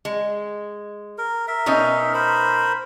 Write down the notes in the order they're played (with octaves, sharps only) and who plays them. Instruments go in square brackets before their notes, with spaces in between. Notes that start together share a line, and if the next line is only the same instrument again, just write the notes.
[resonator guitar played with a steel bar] G#3
[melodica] A#4
A#4 E5
[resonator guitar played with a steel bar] B2 C#4 D#4
[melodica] A#4 C5 B5